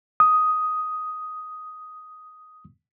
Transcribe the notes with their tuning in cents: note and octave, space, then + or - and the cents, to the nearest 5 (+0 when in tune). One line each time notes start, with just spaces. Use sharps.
D#6 +5